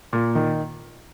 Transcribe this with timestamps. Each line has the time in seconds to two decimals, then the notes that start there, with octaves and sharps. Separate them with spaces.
0.13 A#2
0.35 D#3